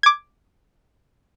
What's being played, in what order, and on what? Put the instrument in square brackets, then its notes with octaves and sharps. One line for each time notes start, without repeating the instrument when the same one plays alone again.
[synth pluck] D6 G#6